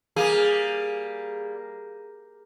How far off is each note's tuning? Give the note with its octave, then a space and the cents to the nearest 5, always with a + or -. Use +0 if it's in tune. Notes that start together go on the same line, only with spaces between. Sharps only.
G3 +0 A#3 +0 G#4 -5